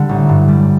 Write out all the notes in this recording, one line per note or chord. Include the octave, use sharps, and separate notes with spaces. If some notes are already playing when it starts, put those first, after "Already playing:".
Already playing: D3 G3
A1
G2
G3